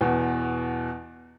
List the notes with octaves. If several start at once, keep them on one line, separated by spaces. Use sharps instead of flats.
E2 B2